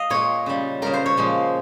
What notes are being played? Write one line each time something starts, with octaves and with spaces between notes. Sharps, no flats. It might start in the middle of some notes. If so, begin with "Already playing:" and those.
Already playing: D#5 F5
A#2 G#3 C#5
C#3 G3
C#3 G3 A#4
C5
C#5
A#2 F3 G#3